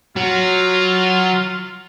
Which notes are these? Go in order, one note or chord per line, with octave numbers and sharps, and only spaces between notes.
F#3 F4